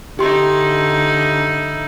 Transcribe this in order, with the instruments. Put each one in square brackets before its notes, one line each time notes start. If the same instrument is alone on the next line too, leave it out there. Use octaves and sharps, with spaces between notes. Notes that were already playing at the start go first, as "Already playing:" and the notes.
[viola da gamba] D3 [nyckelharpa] D#4 E4 [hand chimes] G4 C6